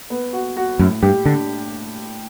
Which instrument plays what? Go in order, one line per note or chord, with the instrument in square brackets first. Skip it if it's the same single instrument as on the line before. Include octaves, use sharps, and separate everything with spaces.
[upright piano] B3
F#4
F#4
[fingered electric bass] F#2 [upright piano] A2
[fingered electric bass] G2 [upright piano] G4
[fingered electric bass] D3 [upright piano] D4